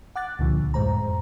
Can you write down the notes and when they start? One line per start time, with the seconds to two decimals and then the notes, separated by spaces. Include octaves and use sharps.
0.16 F#5 D6 F#6 A6
0.39 C#2 A#2 D3 F3
0.74 F2 A2 G#3 C5 A#5